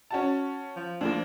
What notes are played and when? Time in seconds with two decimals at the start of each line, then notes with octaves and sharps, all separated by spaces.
0.10 C#4 F#4 A5
0.77 F3
1.01 D2 F3 A#3 D4